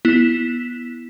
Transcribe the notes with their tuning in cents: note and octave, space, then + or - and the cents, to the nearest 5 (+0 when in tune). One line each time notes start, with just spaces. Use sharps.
B3 -15 E4 +0